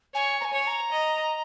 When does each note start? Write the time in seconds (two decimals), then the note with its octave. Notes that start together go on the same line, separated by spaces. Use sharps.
0.14 C#5 G#5
0.40 A#5
0.44 G#5
0.53 C#5
0.67 A#5
0.92 D#5